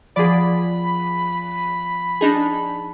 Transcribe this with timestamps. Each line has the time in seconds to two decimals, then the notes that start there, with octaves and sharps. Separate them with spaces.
0.16 F3 B3 G#4 D5 B5
2.21 D4 D#4 G#4 A5